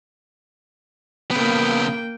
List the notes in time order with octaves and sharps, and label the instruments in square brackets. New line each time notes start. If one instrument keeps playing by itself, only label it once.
[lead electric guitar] C#3 B3 [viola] A#3 G5